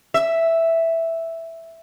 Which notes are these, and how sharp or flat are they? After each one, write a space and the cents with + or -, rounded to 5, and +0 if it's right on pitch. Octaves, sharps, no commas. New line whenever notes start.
E5 +0